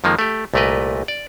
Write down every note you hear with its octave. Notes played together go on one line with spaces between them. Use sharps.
F2 D#3 F3 G#3 A#3
A3 G4
C2 A#2 A3 A#4 B4 D#5
D5